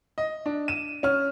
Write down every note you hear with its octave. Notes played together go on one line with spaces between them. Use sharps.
D#5
D4
D#7 E7
C#4 F6